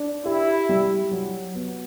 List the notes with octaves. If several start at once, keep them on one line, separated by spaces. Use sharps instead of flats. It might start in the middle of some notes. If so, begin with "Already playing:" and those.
Already playing: D4
E4 G4
G3
F#3
B3